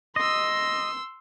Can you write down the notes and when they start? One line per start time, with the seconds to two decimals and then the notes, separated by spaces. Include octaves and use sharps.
0.16 D#5 C6 E6